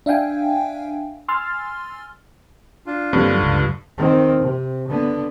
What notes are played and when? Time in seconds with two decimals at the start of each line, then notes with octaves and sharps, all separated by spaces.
0.06 D4 E5 F5 G5 G#5
1.28 G#5 C6 E6 F6 A6
2.86 D4 F4
3.13 G2 D3 F#3 A#3 C4
3.39 C#2 F#2
3.98 D#3 C4
4.42 C3
4.88 D3 B3